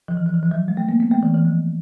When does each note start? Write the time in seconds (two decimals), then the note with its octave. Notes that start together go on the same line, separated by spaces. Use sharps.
0.08 F3
0.17 E3
0.26 F3
0.34 E3
0.43 F3
0.51 F#3
0.68 G#3
0.77 A3
0.89 A#3
1.00 B3
1.11 A3
1.23 E3
1.34 E3
1.45 F3